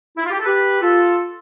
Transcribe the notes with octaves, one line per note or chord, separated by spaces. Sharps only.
E4
F4
G4
A4
G4 B4
F4 A4